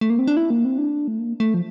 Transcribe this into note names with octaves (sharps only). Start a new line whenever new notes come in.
A3
A#3
C4
D4
E4
A#3
C4
D4
A3
A#3
A3
F3